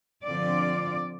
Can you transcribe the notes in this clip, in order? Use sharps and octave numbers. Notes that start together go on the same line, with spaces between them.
D3 F3 C4 F4 D5